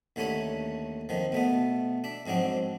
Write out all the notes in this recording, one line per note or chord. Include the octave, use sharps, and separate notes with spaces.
D#2 D3 A3 C#4 C#5 B5
F2 D#3 F3
B2 A3 B3
D4 E5
F2 G#2 F#3 C4 D4